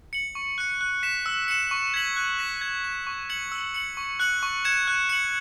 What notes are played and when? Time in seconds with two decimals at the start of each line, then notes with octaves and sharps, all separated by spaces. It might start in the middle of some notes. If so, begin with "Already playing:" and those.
0.13 C#7 F#7
0.35 C#6
0.58 F#6 C#7
0.81 F#6
1.03 B6 E7
1.26 E6
1.48 C#7 E7
1.71 C#6
1.94 G#6 B6 F#7
2.16 F#6
2.39 B6 E7
2.61 G#6
2.84 E7
3.07 C#6
3.30 G#6 C#7 F#7
3.52 E6
3.74 C#7 F#7
3.97 C#6
4.20 F#6 C#7 F#7
4.43 C#6
4.65 G#6 C#7 E7
4.88 F#6
5.09 C#7 F#7